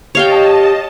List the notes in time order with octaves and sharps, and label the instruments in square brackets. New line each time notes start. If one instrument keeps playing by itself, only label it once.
[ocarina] G4 [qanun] C#5 F5 G5 [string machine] D#5 A5